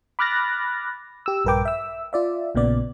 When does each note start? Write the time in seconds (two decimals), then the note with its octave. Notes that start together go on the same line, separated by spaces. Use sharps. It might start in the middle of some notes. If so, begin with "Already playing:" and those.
0.19 B5 D6 F6 F#6 A6 A#6
1.26 G4 E6
1.45 A#1 G2 A#4 B4 G5 D6
1.65 E5 E6
2.13 F4 D5 E5
2.55 A#1 A#2 C#3 B3 D5